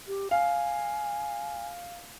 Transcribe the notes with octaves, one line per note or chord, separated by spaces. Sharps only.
G4
F5 G#5